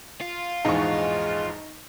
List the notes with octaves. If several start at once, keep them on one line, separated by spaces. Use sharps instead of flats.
F4
A#1 E2 G#2 G#3 D#4 C#6